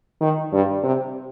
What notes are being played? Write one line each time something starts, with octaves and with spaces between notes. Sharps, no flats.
D#3
G2
C3